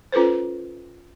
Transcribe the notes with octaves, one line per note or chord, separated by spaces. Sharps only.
C#4 F4 A4 B4 C5